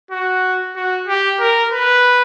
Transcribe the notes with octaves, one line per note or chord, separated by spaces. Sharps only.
F#4
F#4
G4
A#4
B4